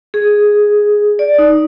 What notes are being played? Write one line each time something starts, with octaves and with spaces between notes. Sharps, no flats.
G#4
D5
D#4